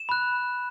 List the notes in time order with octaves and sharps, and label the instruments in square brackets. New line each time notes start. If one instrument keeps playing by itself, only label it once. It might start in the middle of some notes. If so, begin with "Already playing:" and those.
Already playing: [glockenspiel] E7
B5 F#6